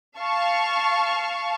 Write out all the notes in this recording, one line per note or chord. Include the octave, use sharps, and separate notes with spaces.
F5 A5 C#6